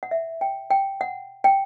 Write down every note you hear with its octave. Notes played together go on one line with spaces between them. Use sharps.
F#5
E5
G5
G5
F#5
G5